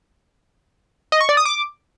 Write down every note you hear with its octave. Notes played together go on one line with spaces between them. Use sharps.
D#5
C#6
D5
D#6
D6